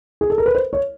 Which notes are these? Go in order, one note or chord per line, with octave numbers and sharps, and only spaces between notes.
G#4
A4
A#4
B4
C5
C#5